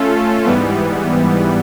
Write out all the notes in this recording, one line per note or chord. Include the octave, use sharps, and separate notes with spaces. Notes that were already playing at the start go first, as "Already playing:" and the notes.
Already playing: A3 C#4 F4 A4
G#2 E3 G3 B3